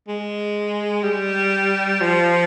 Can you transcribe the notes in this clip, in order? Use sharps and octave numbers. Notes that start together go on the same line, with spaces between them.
G#3
G3
F3